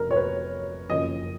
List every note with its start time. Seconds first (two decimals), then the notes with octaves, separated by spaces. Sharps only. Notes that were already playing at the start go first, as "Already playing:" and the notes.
Already playing: F1 C#3 A#4
0.11 C#5
0.16 B4
0.89 F#1 F#2 F3 D#5